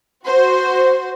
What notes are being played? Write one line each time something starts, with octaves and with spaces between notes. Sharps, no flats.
F#4 C5